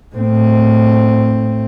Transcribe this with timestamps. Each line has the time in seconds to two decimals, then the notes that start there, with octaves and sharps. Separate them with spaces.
0.16 A2 C4